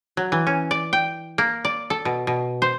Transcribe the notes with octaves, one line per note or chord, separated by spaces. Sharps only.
F#3
E3
C#4
D5
G5
A#3
D5
A4
B2
B2
C5